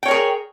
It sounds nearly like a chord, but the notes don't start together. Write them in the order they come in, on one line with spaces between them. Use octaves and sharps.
G5 C#5 A#4 G#4